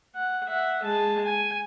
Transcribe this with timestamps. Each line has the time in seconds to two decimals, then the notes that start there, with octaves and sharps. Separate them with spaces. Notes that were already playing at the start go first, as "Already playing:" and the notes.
0.16 F#5
0.47 E5 F#5
0.83 G#3 A5
1.25 G#5